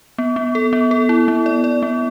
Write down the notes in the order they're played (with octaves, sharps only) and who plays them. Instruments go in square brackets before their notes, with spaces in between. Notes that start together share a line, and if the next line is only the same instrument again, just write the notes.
[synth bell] B3
B3
A4
B3
A4
E4
B3
D5
D5
B3